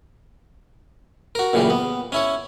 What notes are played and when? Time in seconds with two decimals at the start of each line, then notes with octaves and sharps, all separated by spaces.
1.35 F#4 A#4
1.53 F#2 A#2 C#3 E3 G3
1.70 B3
2.12 C#4 E4 C#5